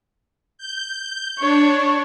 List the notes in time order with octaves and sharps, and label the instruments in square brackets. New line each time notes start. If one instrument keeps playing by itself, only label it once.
[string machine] G6
[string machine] D4 [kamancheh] C#5